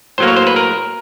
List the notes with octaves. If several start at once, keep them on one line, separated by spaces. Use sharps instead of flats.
A2 F#3 A#3 C5
C#5
C5
B4
A#4